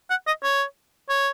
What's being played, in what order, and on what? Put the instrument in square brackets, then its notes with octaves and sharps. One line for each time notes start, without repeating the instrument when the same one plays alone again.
[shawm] F#5
D#5
C#5
C#5